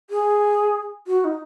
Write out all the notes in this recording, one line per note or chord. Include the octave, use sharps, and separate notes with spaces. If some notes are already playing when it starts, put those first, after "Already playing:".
G#4
F#4
D#4